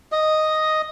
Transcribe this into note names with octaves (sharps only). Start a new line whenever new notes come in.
D#5